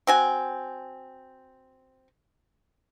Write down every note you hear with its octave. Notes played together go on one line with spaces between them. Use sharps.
C4 F#4 G#5